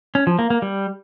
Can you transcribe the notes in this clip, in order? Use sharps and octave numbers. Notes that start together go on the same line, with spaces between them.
C#4
F3
A#3
A#3
G3